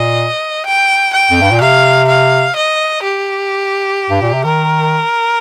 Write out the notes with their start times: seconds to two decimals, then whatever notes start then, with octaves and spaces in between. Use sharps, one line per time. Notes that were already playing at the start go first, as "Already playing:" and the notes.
Already playing: A#2 D#5
0.66 G5
1.14 G5
1.31 F2
1.41 G2
1.51 A#2
1.61 C3 F5
2.08 F5
2.56 D#5
3.03 G4
4.09 G2
4.22 A#2
4.33 C3
4.45 D#3 A#4